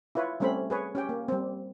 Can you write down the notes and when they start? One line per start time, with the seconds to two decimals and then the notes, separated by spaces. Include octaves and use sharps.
0.15 E4 F4 B4 C#5
0.40 G3 A3 C4 C#4 C5 B5
0.70 G#4 B4 C#5
0.95 C#4 G4 G5
1.09 A#3
1.28 G3 C4